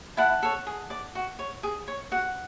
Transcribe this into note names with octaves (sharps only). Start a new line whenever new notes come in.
E4 F#5 A5
A4 C#5
G#4
D5
F#4
C#5
G#4
C#5
F#4 F#5